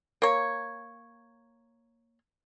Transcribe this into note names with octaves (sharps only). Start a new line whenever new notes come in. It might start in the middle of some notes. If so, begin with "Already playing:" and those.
A#3 C#5